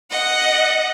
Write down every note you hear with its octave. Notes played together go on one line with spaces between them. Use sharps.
D#5 F#5